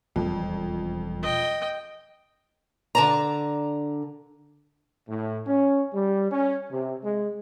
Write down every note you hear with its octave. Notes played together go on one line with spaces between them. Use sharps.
E1 F2 G3
D#5 G5
D3 A5 A#5
A2
C#4
G3
C#4
C3
G#3